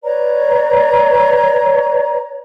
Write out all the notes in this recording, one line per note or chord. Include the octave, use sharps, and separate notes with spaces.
B4 C#5 D5 A#5